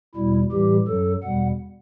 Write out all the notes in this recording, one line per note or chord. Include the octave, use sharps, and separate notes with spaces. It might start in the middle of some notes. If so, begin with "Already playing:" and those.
E2 B2 G3 E4
A2 E3 G3 G4
F#2 F#3 A4
E2 B2 G3 F#5